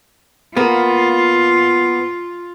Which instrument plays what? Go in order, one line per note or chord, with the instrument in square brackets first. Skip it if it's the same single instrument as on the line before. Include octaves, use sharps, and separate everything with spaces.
[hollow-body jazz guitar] A#3 B3 [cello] F4